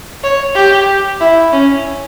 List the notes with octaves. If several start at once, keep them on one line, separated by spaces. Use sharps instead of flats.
C#5
G4
E4
C#4